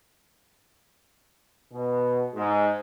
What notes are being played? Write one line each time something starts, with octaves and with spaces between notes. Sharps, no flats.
B2
G#2